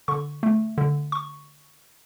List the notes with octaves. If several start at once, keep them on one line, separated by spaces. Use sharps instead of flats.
D3 C#6
A3
D3
C#6